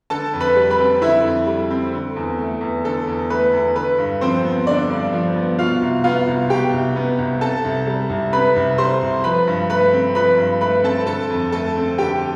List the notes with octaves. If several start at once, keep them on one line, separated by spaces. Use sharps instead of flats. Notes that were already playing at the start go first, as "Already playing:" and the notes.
D3 A4 A5
F2
B4 B5
G3
B4 B5
C4
D3 E4 E5
F2
G3
C4
D3
E2
A3
E2
D3 A4
E2
A3 B4
E2
D3 B4
G2
F3 C4 C5
B3
D3 D4 D5
G2
F3
B3
B2 F4 F5
C2
B3 F4 F5
C2
B2 G4 G5
C2
B3
C2
C3 A4 A5
C2
G3
C2
C3 B4 B5
C2
G3 C5 C6
C2
F3 B4 B5
G2
A3 B4 B5
C4
F3 B4 B5
G2
A3 B4 B5
C4 A4 A5
D3 A4 A5
F2
A3 A4 A5
C4
D3 G4 G5